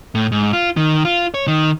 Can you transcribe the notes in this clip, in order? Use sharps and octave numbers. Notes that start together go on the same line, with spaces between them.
A2
G#2
F4
D#3
F4
C#5
D#3